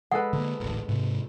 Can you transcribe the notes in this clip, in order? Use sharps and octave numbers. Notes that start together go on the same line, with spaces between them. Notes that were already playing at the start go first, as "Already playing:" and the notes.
G#3 A4 B4 F#5
D3 A#3
D#1 A1 D2
G#2 C3